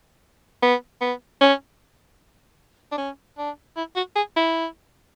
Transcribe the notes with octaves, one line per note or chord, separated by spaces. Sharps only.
B3
B3
C#4
D4
C#4
D4
E4
F#4
G#4
E4